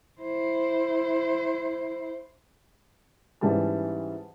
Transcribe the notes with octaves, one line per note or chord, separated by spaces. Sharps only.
E4 C5
G#2 E3 G3 C#4 G#4 A5